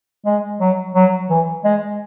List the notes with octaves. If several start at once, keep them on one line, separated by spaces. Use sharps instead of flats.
G#3
F#3
F#3
E3
G#3